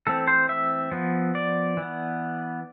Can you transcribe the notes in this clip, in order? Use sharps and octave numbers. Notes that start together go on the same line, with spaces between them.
E3 A3 C4 A4
C5
E5
F3 B3
D5
E3
B3